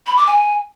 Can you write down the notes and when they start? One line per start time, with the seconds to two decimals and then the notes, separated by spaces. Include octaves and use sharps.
0.07 B5
0.17 D6
0.27 G#5